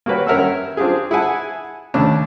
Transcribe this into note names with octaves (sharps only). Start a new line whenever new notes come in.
A#3 F#4 G4 B4 C#5
G2 C#4 A#4 E5 F#5 E6
C4 D4 F4 G4 G#4
E4 G#4 F#5 G#5 A5
D#2 C#3 A3 C#4 D4